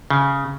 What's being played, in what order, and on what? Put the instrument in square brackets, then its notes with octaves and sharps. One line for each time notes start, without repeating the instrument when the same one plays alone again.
[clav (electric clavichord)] C#3